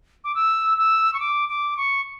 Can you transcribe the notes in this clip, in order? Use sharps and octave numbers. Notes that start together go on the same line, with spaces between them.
D6
E6
E6
C#6
D6
D6
C#6